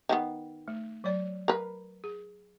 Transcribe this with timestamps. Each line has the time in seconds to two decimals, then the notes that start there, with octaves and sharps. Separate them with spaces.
0.09 D#3 G3 B3
0.68 A3
1.04 F#3 C#5 D5
1.48 A#4 B4
2.04 G#4